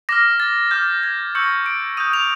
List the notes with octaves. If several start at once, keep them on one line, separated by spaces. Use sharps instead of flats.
D6 F6 A#6
A6
D6 F6 G6
G#6
C#6 E6 G6 C#7
D7
D#6 G6 D#7
F7